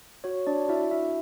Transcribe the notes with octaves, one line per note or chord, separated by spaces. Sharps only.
F#4 C#5
D4 D5
E4 F#4 E5
E4 E5